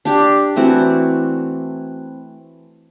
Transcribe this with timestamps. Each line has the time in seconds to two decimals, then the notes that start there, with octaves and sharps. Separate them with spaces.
0.05 D4 G4
0.56 E3 A3 C4 F#4